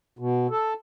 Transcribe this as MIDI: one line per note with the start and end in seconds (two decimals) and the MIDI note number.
0.19 0.47 47
0.51 0.74 69